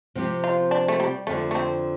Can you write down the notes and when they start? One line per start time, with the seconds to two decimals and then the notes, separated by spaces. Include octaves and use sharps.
0.15 C3 F3 C4 G4
0.44 F4
0.71 D4
0.88 A3
1.00 G3
1.27 F2 D3 F3 A3
1.51 A3
1.55 C4